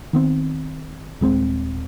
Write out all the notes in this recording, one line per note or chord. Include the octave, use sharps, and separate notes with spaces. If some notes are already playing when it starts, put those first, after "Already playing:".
D#3 B3 C4
D#1 G#3 B3 C4